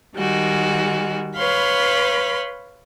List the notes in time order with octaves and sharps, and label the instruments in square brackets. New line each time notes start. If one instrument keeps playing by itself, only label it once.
[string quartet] D#3 G3 G#3 F#4
B4 C#5 F5 B5 C6